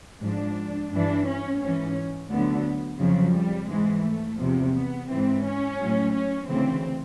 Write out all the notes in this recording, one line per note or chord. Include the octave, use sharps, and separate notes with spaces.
G#2 F3 D4
G2 E3 D4
C#4
G#2 E3 C#4
D2 D3 F#3 B3
F2 C#3 F3 F#3
G3
G#2 E3 G#3
A3
E2 C3 F3
B3
G#2 E3 C4
C#4
A2 F#3
C#4
D2 C#3 E3 C4